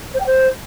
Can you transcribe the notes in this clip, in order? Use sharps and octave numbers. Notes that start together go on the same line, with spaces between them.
C5
G5
C5